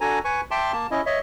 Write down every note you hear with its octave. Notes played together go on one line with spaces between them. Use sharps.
D4 F#4 A4 G#5 A#5
B4 G#5 C#6
E5 G5 A5 C6 D6
A#3 A5
C#4 E4 D#5
C#5 D#5 E5